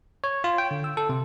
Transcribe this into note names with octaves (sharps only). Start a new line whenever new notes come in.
C#5
F4
G5
D3
E6
A4
C3